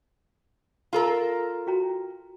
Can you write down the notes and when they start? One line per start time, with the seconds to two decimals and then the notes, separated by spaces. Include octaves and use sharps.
0.93 F4 A4 A#4
1.67 F#4 G5 A#5